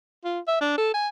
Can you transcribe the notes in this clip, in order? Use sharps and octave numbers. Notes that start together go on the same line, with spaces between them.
F4
E5
D4
A4
G#5